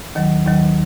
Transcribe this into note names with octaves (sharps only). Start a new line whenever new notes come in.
D#2 D#3 F#3
D#2 D#3 F#3